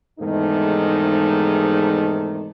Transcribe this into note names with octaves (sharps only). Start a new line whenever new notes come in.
E2 G#2 C3 D#3 A3 D#4